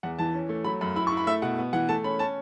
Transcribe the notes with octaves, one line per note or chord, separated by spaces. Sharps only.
E2 F#5
E3 A5
C#4
A3
F#3 B5
F#2 B5
E4 B5
C#6
E4
B5
A3 E5
B2 F#5
B3
E3 F#5
A3 A5
C#4 B5
C#4 A5